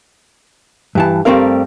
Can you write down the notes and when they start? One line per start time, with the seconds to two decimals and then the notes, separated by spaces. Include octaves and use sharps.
0.95 G2 E3 A5
1.25 G2 G3 A3 C4 A#4 F5